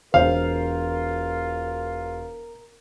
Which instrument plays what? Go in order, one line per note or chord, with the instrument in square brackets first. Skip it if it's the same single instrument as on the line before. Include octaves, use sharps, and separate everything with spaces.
[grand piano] E1 C5 [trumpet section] F4 [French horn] A#4 [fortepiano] F5